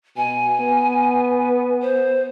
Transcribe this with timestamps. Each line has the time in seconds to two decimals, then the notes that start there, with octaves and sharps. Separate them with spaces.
0.17 B2 G#5
0.60 B3
1.82 C5